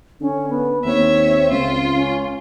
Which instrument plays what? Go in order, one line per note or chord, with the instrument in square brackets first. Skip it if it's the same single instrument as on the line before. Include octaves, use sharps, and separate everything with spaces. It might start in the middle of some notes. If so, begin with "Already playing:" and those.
[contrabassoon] D3 [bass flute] C#4
[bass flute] B3
[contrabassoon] D#2 [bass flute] C4 [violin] C#5 E5
[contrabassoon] C#2 [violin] F4
[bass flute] C#4